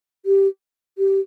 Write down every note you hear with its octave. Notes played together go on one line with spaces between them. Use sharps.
G4
G4